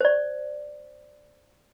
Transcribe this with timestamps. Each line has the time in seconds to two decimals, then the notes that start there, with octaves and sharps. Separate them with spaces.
0.01 C5 D5